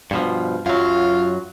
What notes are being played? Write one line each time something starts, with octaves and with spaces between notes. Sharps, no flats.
G2 B2 F3
F#2 F#3 F4